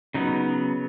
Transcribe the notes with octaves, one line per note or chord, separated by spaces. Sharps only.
C#3 F#3 B3 D#4